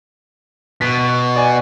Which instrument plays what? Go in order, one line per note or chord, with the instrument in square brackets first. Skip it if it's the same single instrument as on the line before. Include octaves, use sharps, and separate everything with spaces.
[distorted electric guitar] B2 [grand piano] B6
[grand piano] D5 G#5